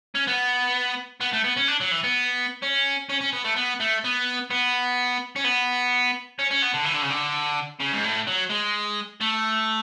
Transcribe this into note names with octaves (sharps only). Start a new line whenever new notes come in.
C#4
B3
B3
A3
B3
C#4
D4
F#3
E3
B3
C#4
C#4
C#4
B3
A3
B3
A3
B3
B3
C#4
B3
C#4
C#4
B3
D3
E3
D3
C#3
D3
C#3
G#2
A2
F#3
G#3
A3